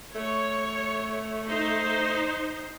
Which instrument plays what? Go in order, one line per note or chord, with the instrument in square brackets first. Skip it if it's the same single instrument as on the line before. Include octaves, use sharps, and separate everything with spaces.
[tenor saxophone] A3 [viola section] C#5
[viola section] D#4 C5